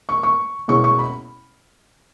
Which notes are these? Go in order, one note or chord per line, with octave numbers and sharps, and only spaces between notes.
C#6
C#6
B2 G#3 C#4 E4 C#6
C#6
B5